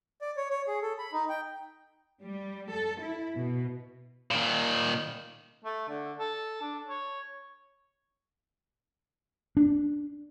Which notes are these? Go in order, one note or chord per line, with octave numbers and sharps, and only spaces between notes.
D5
C#5
C#5
G#4
A4
B5
D#4
G5
G3
A4
E4
B2
A#2 D#3
A3
D3
A4
D4
C#5
D4